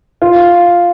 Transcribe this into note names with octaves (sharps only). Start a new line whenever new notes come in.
F4